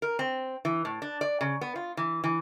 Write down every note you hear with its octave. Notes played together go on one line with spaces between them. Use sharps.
A#4
C4
E3
A2
D4
D5
C#3
B3
F4
E3
E3